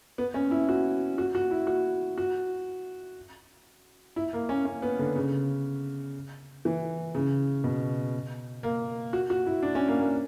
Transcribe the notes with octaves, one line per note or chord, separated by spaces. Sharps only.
B3
C#4
E4
F#4
F#4
F#4
E4
F#4
F#4
E4
A#3
C#4
C#4
B3
D3
C#3
E3
C#3
B2
A#3
F#4
F#4
E4
D4
C#4
A#3
A#3